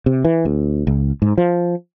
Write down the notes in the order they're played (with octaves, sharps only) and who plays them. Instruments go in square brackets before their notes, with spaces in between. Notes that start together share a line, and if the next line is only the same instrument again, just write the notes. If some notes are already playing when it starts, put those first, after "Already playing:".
[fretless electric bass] C3
E3
D2
C#2
G#2
F3